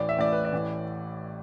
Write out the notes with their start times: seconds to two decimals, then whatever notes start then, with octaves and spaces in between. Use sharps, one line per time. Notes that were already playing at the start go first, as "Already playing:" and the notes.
Already playing: A1 A2 E3 D5
0.09 E5
0.17 A1 A2 E3 D5
0.32 B4
0.45 D5
0.52 A1 A2 E3